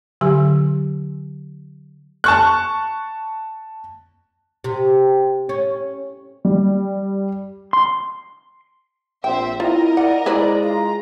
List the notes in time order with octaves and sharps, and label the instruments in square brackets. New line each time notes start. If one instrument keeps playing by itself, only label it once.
[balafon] D3 F#3 G4 G#5
[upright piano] A5 C#6 F#6
[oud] C3
C#4
[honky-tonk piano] G3
[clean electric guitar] C6
[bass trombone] A#1 [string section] C4 C5 E5 [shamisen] G5
[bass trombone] E4 [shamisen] F4 [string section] A#4 D#5
[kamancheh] D5 [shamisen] F#5
[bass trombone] G#3 [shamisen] E4 B4 C5 [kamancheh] D5 A#5
[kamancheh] F4 A#5